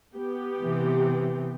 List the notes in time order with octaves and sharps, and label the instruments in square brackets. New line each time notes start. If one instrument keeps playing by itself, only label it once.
[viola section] B3 G4
[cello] C3 E3